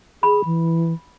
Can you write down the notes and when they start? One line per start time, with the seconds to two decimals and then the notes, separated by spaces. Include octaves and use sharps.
0.23 G#4 B5
0.45 E3